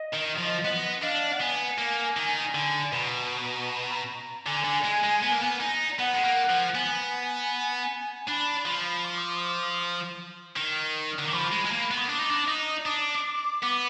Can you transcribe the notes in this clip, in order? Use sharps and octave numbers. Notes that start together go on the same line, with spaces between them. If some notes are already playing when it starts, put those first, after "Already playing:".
Already playing: D#5
D#3
F3
B3 D#5
D4 F5
F#5
B3 G#5
A#3
D#3
D3
B2 A#5
D3 G#5
D3
G#3
G#3
B3
A#3
B3
D#4
B3 F#5
G#3
A#3
F3
B3 G#5
D4 B5
F3 B5
D6
D#6
D6
D#6
D6
D#6
D#3
D3
D#3 D6
F3 B5
G#3
G#3
A#3
B3
D#6
D4 D6
D#4
D4
D#4 D#6
D4 D6
B3